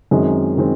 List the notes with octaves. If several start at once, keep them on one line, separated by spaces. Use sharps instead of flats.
F#2 D#3 G#3 C4
D#3 G#3 C4